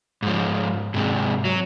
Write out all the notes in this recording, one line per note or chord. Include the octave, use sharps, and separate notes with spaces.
G#2 F3
G#2 C3
F#3